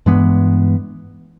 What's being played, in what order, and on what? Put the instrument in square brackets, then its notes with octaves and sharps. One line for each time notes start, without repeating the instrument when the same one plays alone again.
[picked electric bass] G2 E3 G#3 B3